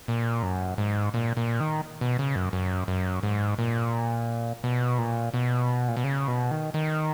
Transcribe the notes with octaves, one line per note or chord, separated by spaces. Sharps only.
A#2
F#2
G#2
A#2
A#2
D#3
B2
C#3
F#2
F#2
F#2
G#2
A#2
B2
A#2
B2
A#2
B2
C#3
B2
D#3
D#3